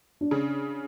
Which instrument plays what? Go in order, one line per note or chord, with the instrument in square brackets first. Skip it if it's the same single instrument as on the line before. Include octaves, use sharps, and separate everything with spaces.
[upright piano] D4
[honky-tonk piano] C#3